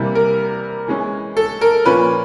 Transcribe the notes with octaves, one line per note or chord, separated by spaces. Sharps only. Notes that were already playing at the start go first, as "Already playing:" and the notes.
Already playing: C3 E3 G3 A#3
A#4
E3 G#3 C#4
A4
A#4
A#2 F3 A#3 C#4 B4